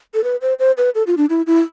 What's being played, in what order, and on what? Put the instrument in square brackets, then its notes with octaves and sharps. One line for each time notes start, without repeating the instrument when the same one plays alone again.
[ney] A4
B4
C5
C5
B4
A4
F4
D4
E4
E4